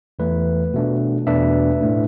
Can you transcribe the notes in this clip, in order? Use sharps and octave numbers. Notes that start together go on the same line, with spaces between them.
E2 E3 A3 B4
B2 A3 D4
E2 B2 A3 D4 B4 E5
A2 A3 D4